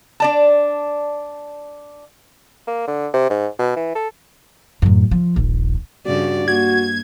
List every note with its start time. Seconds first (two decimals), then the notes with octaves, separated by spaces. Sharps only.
0.20 D4 D5 A5
2.68 A#3
2.88 D3
3.14 C3
3.30 G#2
3.59 B2
3.76 E3
3.95 A4
4.82 F#2 A2
5.11 F3
5.36 D#1 A#1
6.06 G2 C#3 F#4 D5
6.48 A#3 F#4 G#6